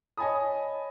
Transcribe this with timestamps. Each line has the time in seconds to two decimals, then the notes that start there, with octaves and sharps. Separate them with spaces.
0.17 C#5 D#5 G#5 A5 B5 D#6